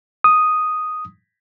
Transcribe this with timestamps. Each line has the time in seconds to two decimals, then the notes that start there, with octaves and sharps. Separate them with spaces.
0.24 D#6